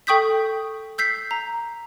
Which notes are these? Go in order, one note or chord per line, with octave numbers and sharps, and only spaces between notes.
A4 G5 C#6 D#6 G6 B6
E6 G6 B6 C7
A#5